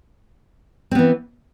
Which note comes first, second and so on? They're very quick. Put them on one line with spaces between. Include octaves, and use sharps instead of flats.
C4 B3 E3